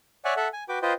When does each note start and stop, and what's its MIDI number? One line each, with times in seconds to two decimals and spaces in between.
0.25 0.34 73
0.25 0.34 74
0.25 0.34 76
0.25 0.34 78
0.25 0.34 80
0.37 0.48 69
0.37 0.48 76
0.37 0.48 78
0.53 0.64 80
0.69 0.79 66
0.69 0.79 71
0.69 0.79 79
0.69 0.79 86
0.82 0.93 65
0.82 0.93 71
0.82 0.93 72
0.82 0.93 75
0.82 0.93 79